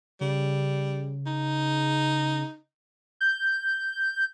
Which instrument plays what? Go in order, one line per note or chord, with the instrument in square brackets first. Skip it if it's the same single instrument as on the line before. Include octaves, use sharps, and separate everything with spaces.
[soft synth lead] C#3 [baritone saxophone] G3
[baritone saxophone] D#4
[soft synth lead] G6